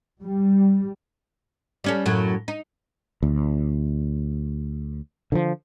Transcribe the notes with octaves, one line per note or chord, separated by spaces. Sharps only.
G3
G3 C#4 A4
F#2 A2 F#3
D#4
D2
D3 E3 F3